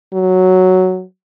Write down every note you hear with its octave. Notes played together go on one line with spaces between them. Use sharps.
F#3